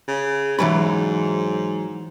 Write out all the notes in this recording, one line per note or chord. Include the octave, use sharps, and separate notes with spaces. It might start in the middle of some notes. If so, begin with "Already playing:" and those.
C#3
G#2 E3 F#3 B5